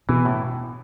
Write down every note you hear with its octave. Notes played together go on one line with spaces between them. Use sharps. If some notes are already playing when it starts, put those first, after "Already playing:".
B2 E3
A2